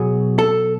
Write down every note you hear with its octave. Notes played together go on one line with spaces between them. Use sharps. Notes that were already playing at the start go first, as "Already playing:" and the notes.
Already playing: B2 F#3 G#4
A4